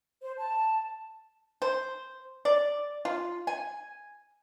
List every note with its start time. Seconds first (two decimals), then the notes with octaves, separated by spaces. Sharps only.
0.22 C5
0.37 A5
1.62 C5
2.45 D5
3.05 F4
3.47 G#5